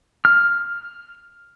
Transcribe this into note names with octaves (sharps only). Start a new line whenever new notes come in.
F6